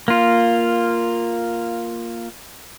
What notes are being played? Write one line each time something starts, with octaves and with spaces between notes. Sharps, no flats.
A#3 F4